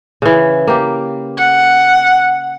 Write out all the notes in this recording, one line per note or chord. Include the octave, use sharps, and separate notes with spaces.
C#3 E3
A#3 G4
F#5